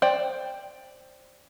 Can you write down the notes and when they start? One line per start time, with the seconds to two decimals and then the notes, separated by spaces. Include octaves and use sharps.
0.02 C5 D5 G5